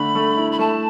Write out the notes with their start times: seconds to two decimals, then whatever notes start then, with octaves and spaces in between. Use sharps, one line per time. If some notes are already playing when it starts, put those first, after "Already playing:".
Already playing: D3 A3 B5
0.15 A3
0.37 E4
0.52 B5
0.59 A3 A5